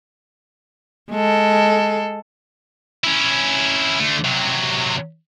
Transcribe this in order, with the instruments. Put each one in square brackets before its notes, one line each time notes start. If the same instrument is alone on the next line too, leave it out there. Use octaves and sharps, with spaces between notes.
[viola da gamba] G#3 A4
[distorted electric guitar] C#4 E4
D3 A3
C3 F#3